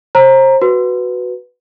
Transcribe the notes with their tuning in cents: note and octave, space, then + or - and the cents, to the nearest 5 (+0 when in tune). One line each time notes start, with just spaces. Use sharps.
C5 +30 A#5 +0
F#4 +0 B4 +0